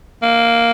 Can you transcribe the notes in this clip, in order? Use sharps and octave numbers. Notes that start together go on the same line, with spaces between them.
A#3